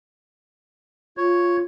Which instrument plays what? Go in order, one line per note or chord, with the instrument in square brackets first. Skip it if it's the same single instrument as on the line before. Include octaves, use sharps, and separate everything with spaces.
[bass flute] F4 [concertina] C#5